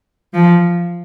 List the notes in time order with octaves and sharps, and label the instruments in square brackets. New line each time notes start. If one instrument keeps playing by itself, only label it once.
[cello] F3